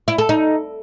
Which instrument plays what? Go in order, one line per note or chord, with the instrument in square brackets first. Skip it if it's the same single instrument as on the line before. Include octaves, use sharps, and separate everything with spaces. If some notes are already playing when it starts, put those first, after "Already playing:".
[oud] E4
A4
D#4